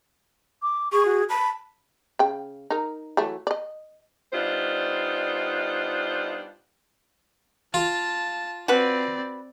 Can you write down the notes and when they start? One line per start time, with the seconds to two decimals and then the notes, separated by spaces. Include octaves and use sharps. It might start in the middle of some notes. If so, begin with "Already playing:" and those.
0.62 D6
0.92 G#4 C#6
1.05 F#4
1.30 A5 B5
2.19 C#3 G5
2.70 D#4 A#4
3.17 E3 F#3 A3
3.47 D5 D#5
4.33 G3 B3 D4 D#4 F4 C5
7.74 F4 A5
8.68 C4 F#4 B4 D5